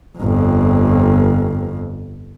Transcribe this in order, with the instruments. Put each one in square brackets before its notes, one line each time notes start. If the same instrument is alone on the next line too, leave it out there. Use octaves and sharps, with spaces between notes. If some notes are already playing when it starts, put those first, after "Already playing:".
[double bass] G1 F2